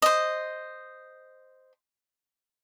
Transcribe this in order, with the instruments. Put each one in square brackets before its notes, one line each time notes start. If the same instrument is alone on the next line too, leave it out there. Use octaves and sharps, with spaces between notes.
[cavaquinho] C5 D#5